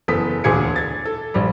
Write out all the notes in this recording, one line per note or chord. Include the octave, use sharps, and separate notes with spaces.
F#1 E3 B3 A4 D#6 B6
E1 D2 A#2 G#4 G#6 C#7
G#6 A6
A4
A#1 G3